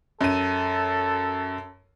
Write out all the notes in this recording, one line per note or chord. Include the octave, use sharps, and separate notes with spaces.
F#2 A4 D#7